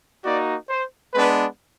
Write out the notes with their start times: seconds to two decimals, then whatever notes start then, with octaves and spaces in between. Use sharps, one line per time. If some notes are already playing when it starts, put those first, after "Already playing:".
0.24 A#3 D#4 F#4 D5
0.69 C5
1.13 G#3 B3 D4 B4